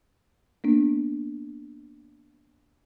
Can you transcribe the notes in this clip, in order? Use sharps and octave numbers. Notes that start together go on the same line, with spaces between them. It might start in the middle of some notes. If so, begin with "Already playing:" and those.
A#3 B3 D4